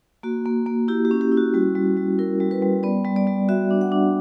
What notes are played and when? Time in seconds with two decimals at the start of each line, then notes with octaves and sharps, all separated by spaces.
0.23 A#3 F#4
0.46 A#3
0.66 A#3
0.88 E4 G4
1.05 G4
1.11 C#4
1.21 G4
1.32 E4
1.37 F#4
1.54 G3 F#4
1.75 G3
1.97 G3
2.19 E4 A#4
2.40 G3
2.51 B4
2.62 G3
2.83 B3 D5
3.05 G3
3.16 D5
3.27 G3
3.48 F#4 E5
3.71 D4
3.81 F#5
3.92 D4